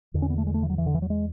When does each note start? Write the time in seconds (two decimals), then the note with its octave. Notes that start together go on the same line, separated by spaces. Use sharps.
0.14 E2 D3
0.22 C#4
0.30 B3
0.38 A3
0.47 G#3
0.54 A3
0.63 E3
0.70 F#3
0.78 E3
0.86 D3
0.94 E3
1.02 F#3
1.10 G#3